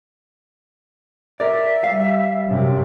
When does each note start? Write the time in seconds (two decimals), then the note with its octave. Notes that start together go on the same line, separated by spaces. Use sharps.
1.40 A#4 D5 E5
1.84 G3 F5
2.48 F#2 C3